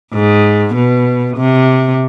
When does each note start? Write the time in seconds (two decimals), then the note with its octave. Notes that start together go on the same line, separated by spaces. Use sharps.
0.13 G#2
0.75 B2
1.37 C3